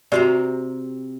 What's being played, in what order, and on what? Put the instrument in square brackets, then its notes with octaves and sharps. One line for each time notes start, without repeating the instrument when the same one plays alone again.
[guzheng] C3 C5 A#5 [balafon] F#4 G4 D5